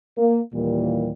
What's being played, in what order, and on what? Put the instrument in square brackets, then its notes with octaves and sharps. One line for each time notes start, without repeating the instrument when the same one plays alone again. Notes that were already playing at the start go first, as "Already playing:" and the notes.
[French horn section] A#3
D#2 A#2 E3 G3 A#3